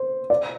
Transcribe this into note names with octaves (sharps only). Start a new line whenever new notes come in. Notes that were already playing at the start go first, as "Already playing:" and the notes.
Already playing: C5
D5